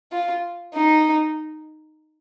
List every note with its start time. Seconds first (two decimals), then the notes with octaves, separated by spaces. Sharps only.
0.12 F4
0.74 D#4